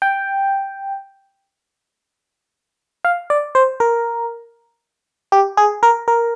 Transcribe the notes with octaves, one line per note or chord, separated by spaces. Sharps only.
G5
F5
D5
C5
A#4
G4
G#4
A#4
A#4